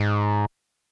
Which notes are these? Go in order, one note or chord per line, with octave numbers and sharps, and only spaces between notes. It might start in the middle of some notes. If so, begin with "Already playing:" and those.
Already playing: G#2